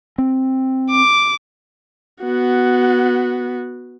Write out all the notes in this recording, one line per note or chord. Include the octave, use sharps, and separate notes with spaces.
C4
D6
B3 F#4